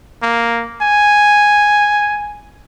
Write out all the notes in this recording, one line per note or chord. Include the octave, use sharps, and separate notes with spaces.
A#3
G#5